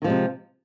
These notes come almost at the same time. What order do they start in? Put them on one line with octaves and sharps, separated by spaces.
D#3 F3 G#3 C3